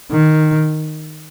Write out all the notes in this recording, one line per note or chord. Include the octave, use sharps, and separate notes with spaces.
D#3